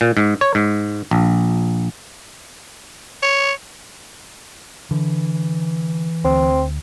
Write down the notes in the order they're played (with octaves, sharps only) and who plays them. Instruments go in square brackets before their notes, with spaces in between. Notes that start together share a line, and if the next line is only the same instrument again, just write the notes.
[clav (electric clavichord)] A#2
G#2
C#5
G#2
A#1
[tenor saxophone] C#5
[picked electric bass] D3 [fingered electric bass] E3
[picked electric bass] D2 [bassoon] C4